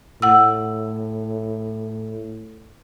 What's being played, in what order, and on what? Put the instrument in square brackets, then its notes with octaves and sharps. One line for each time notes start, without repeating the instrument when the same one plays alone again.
[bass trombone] A2 [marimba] F#5 E6